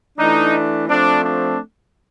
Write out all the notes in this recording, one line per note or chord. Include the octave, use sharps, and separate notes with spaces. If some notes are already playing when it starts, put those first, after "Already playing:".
E3 A3 D4 D#4
F3 A3 C4 D4
D4